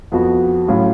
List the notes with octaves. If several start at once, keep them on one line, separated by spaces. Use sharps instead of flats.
F2 F3 B3 F#4
A2 F#3 C#4 F4